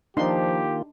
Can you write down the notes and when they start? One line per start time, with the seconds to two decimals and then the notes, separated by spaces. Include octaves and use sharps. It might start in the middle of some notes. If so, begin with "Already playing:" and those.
0.17 D#3 F3 A#3 D4 D#4 F4 G4 C6